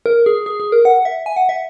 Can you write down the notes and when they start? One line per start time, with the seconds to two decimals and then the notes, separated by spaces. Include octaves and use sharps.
0.06 A#4
0.26 G#4
0.46 G#4
0.60 G#4
0.72 A#4
0.85 F#5
1.05 E5
1.26 G#5
1.36 F#5
1.49 E5